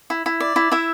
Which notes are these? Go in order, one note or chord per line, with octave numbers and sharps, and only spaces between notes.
E4
E4
D5
E4
E4 E5